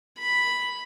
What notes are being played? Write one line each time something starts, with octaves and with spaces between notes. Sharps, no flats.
B5